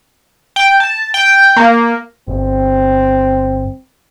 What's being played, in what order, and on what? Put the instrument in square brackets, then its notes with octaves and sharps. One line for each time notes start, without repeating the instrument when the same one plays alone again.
[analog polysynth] G5
A5
G5
A#3
[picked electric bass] G1 [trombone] C4